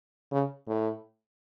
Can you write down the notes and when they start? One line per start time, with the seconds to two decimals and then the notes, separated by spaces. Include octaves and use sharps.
0.32 C#3
0.68 A2